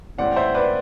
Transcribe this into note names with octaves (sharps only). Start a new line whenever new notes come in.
A1 A2 G3 C4 D5 F#5
C5 E5
B4 D5